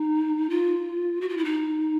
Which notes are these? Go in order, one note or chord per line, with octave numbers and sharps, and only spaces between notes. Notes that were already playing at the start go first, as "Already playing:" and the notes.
Already playing: D#4
F4
F#4
F4
E4
D#4